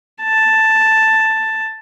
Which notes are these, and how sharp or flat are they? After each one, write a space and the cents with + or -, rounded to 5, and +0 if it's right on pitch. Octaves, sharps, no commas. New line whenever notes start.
A5 +5